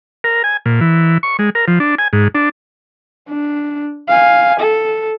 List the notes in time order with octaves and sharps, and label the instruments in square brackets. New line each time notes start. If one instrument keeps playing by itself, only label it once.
[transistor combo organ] A#4
G#5
A#2
E3
C#6
G#3
A#4
F3
D4
G#5
G#2
D4
[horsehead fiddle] D4
F5 G#5
A4